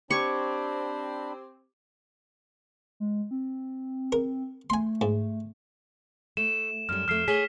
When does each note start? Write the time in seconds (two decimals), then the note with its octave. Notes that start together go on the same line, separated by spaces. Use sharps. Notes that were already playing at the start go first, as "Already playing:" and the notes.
0.11 C4 D4 G4 B5 C#6 D6 G#6
3.00 G#3
3.31 C4
4.12 A#4
4.70 A3 G#5 C6
5.01 G#2
6.37 A3 E7
6.89 F#2 G3 F6
7.08 F2 A3 F6 C7
7.28 G#4 C#5 G#5 B6 G7